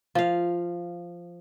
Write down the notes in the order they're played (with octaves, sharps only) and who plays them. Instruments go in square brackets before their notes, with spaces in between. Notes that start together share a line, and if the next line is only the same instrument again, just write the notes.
[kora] F3 F5